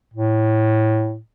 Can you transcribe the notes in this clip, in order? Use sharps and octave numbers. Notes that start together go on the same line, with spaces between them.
A2